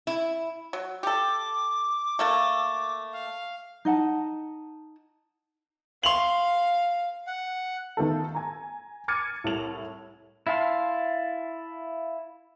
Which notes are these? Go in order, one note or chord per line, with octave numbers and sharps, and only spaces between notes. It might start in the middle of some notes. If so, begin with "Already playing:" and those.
E4
F#3
G4 A4 D6
A3 A#3 A4
F5
D#4 D#5 F#5 A5
F5 C6 F7 F#7
F#5
D#3 A3 B3 F4 A4
G#5 A#5
D6 F6 G#6 A6 C#7 D#7
C2 A2 A4 F7
E4 E5 F5 A5 C6